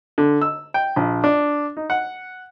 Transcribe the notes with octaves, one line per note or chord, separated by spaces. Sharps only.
D3
E6
G5
A#1
D4
D#4
F#5